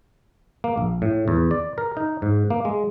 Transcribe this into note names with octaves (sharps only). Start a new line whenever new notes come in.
A#3
A#1
A2
E2
D5
A#4
D#4
G#2
A#3
G#3